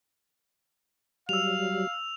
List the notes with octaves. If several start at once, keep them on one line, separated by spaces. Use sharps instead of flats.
F#3 G3 F5 E6 F7